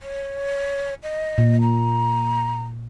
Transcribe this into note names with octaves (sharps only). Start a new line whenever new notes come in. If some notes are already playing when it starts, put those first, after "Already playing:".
C#5
D#5
A#2
A#5